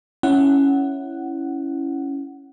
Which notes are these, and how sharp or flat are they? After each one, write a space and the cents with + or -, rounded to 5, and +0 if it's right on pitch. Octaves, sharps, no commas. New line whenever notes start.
C#4 +0 E4 +0 F#5 +5